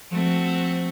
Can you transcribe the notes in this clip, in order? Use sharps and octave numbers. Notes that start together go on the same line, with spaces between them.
F3 A3 C4 F#4